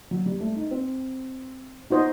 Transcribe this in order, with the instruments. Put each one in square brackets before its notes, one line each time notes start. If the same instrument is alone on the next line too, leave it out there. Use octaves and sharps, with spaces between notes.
[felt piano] F#3
G3
A3
D#4
C4
[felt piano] B3 [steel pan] D#4 F#4 C5 D#5